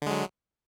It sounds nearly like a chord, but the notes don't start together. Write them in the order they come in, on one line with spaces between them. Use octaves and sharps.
D3 G#3 F#3